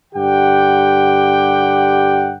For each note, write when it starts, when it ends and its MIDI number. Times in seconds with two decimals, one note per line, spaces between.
0.13 2.34 43
0.13 2.34 50
0.13 2.34 67
0.13 2.34 78
0.13 2.34 79